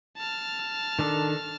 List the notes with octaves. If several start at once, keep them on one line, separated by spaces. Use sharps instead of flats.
A5 F6
D#3 D4 A4